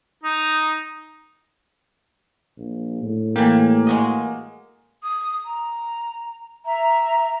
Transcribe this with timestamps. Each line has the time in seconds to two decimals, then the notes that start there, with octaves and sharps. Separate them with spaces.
0.23 D#4
2.58 A#1
3.03 A2
3.36 E3 A#3 G4
3.87 G#3 F#4 D#5
5.03 D#6
5.45 A#5
6.66 E5 A#5